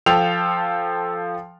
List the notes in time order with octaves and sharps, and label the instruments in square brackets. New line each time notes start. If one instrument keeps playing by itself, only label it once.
[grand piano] F3 A4 F5 G5 F7